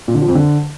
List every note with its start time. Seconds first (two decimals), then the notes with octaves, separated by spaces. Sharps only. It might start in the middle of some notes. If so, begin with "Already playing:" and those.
0.08 A#2
0.15 D3
0.22 F3
0.28 F2
0.35 D3